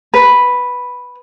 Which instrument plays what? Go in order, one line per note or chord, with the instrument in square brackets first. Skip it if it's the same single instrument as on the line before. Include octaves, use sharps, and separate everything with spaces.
[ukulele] B4